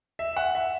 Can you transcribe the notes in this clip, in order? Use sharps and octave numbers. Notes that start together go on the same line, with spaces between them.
E5
F#5
E5